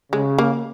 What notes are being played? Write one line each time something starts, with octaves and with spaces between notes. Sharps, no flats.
C#3 G#3
A#3